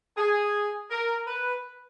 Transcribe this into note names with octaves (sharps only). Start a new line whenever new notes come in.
G#4
A#4
B4